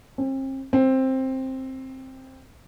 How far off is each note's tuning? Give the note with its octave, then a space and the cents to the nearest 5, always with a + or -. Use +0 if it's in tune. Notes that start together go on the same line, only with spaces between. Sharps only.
C4 +40
C4 +10